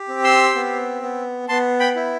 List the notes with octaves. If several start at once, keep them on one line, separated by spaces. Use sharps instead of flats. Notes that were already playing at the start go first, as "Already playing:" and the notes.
Already playing: G4
C4
C6 E6
B3
B3
B3 A5 C6
G5 B5
E4